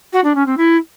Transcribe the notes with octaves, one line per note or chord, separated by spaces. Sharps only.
F#4
D4
C#4
C4
E4